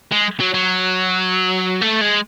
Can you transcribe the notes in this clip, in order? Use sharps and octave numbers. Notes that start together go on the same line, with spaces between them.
G#3
F#3
F#3
A3
G#3